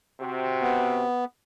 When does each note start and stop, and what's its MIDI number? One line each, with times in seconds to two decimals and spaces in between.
0.20 1.03 48
0.20 1.03 66
0.62 1.25 59